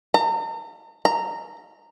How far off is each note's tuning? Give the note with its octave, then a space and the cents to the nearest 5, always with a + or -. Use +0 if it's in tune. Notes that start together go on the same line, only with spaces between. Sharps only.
A#5 -40
A#5 -15